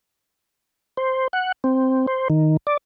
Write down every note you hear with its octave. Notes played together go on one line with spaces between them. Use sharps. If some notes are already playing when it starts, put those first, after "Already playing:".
C5
F#5
C4
C5
D#3
D5